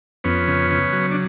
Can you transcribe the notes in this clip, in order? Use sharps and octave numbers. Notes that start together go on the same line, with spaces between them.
F2 B3 C#4
C#3
C#3
F#3
D4